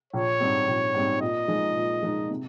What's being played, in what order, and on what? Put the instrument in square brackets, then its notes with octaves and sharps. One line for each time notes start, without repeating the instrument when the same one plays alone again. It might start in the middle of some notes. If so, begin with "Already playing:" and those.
[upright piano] A#1 [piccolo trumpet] C#5
[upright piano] G#2 G3 C4
A#1
G#2 G3 C4
[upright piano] A#2 [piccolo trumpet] D#5
[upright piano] F3 G#3 D#4 G#4
A#2
F3 G#3 D#4 G#4
C3